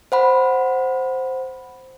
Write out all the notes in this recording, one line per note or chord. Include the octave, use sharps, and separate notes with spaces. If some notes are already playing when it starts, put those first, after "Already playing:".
C5 F#5 B5